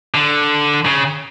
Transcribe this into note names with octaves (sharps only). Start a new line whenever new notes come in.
D3
C#3